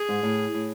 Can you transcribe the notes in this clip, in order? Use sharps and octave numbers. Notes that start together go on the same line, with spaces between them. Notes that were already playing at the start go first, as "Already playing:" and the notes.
Already playing: G#4
G#2
A2
A2